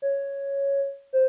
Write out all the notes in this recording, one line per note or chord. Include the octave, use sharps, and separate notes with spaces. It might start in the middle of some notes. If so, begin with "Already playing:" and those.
C#5
C5